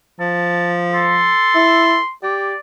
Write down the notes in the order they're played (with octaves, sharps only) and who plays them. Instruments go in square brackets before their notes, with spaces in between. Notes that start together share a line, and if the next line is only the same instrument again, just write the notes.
[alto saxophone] F3 [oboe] A5
[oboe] A4 [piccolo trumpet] C6
[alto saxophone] E4
[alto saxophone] G4 [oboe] D5